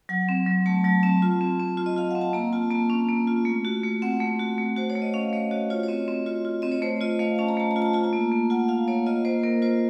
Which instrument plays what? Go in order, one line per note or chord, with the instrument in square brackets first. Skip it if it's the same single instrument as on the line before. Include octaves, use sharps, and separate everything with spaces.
[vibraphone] F#3 F#5
C4
F#3
A3 A5
F#3 A5
C4 A5
F4
C4
C4
F4
D#5
F4 F5
C4 F#5
A5
A#3 A#5
F4 A5
A#3 A5
C#4
A#3
F4
A3
F#4
A3
C4 F#5
A3
F#4
A3
F#4 C5
C#5
A3
D#5
C#4 F5
A3 D#5
F#4 C#5
F4 C#5
C#5
C4 D#5
C4
F4 C#5
F4
C4 D#5
C#5
A3 C5
F4 D#5
A3 F5
C#4 A5
A#5
A3 A5
A#5
F4
A5
F4 A#5
A5
A#3
A#3
F4 F#5
F4 F5
A#3 C#5
F4 D#5
A#3 C5
A#3 A#4
F4 C5